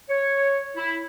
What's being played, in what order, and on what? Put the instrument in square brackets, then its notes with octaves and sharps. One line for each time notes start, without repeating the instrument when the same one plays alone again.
[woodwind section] C#5
E4